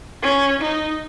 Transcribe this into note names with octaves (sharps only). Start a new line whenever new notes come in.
C#4
D#4